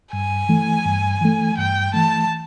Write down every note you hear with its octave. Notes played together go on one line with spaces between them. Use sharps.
G2 G#5
E3 A3
G2
E3 A3
G2 G5
E3 A3 A5